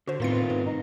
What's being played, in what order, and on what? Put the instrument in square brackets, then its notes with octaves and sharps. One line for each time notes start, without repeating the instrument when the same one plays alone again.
[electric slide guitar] D3 [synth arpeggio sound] F#4 C5
[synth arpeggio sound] A2 A6 C#7 [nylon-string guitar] D#3 B3 C4 [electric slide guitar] A3 F4
[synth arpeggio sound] G#2
[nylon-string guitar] D#4